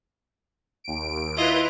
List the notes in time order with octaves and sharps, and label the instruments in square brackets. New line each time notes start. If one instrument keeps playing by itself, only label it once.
[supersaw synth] D#2 D7
[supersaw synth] E4 B4 [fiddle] F4 D#5